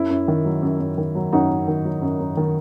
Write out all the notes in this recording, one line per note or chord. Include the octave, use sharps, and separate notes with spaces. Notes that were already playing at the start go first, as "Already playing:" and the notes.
Already playing: F#2 E4
F#2
D#3
F#3
F#2
F#2
D#3
F#3
F#2 D#4 F#4
F#2
D#3
F#3
F#2
F#2
D#3